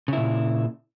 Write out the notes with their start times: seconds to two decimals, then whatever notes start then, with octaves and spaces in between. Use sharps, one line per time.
0.08 C#3
0.13 E4
0.18 A#2